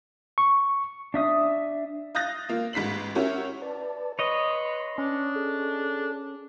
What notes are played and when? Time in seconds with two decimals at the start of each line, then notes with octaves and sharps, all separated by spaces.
0.38 C#6
1.14 D4 E5 D#6
2.15 F5 D#6 F#6 G6 A6 A#6
2.49 A#3 F4
2.73 A1 G#2 B6 C7 F#7
3.15 C#4 E4 F#4 G4 A#4 C#5
3.62 B4 D5 A5
4.19 B4 C#5 D#5 C6
4.98 C#4 D4
5.35 G#4 A4